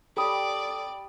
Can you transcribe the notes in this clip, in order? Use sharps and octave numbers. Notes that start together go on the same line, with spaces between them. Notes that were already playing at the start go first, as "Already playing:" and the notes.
G3 A4 D5 D#6